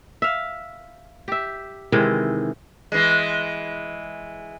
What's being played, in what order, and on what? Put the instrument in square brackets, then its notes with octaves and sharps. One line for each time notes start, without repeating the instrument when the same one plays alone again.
[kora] E5 F5
G4 E5
C3 D#3 E3 G#3
[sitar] E3 G#3